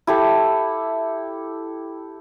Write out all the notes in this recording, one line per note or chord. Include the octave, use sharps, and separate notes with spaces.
E4 G4 A4